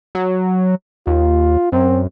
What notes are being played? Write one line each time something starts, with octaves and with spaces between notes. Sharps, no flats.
F#3
D#2 F4
F#2 C4